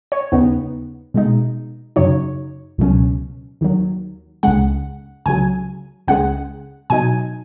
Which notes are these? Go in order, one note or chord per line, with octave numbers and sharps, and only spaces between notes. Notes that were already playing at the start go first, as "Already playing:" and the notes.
C#5
D#2 C#3 B3 D#4
B2 G#3 D#4
F#2 C#3 F#3 D#4 C#5
C#2 B2 F#3 C#4
D#2 D#3 F#3
C#2 C#3 G#3 F#5
C#2 C#3 F#3 G#5
C#2 C#3 G#3 F#5
B2 F#3 D#4 G#5